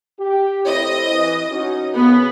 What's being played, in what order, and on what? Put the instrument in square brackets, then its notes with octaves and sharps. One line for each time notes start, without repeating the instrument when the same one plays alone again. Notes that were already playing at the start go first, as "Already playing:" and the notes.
[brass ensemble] G4
[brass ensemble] A2 C4 E4 [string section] D#5
[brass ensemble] E3
C#4 D#4 F#4
[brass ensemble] C#3 [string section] B3